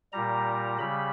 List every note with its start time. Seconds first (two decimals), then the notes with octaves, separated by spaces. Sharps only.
0.13 A#2 G3 A#5
0.79 C#3 G3 B5